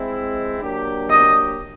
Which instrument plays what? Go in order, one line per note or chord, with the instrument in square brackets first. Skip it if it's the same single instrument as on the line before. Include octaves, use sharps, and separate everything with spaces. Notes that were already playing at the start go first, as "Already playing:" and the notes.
Already playing: [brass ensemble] G#3 C4 E4
F#3 A#3 D4 G4
[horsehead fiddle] D#5